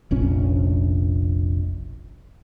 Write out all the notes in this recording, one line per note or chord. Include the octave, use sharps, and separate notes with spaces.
F1 A#1 C#4